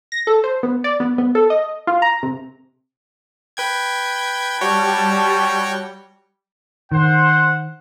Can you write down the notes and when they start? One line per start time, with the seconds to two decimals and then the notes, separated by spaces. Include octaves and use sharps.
0.12 A#6
0.27 A4
0.44 C5
0.63 B3
0.84 D5
1.00 B3
1.18 B3
1.35 A4
1.50 D#5
1.87 F4
2.02 A#5
2.23 C3
3.57 B4 G5 G#6
4.61 G3 F#4 C#5 G5 A5
6.92 D#3 C5 F#5